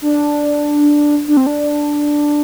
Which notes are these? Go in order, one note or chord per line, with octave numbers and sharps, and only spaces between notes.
D4
D4
C4
D4